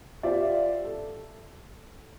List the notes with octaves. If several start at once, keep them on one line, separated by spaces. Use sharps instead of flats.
F4 G4 C5 D5 E5
A4